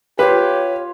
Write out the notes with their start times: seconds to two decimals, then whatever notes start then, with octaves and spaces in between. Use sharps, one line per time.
0.19 F4 G4 B4 C#5